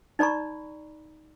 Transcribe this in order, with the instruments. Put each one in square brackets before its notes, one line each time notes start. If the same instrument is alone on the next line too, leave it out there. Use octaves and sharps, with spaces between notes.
[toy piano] D#4 D5 A#5 B5 C#6